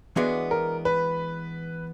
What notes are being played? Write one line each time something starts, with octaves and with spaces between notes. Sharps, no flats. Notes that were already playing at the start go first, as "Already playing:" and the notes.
E3 G#3 B3 D4 F#4
A#4
B4